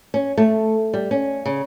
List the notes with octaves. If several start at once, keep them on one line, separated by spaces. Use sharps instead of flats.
C#4
A3
G3
C#4
C#3